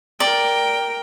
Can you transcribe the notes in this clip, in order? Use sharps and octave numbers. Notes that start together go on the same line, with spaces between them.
A#4 D5 G5